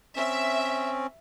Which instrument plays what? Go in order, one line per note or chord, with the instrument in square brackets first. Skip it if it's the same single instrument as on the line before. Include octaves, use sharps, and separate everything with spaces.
[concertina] C4 C#4 [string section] E5